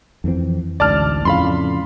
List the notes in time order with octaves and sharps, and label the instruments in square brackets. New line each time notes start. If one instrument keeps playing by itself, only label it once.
[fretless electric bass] F2 E3 C4
[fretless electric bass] A1 D2 G#2 [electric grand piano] D5 A5 F6
[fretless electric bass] F2 A2 C#3 [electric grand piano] F5 B5 C6